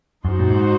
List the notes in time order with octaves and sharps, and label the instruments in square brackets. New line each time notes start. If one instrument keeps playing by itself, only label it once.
[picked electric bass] F#2 [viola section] D#4 F#4 C5
[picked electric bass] A#2
G#2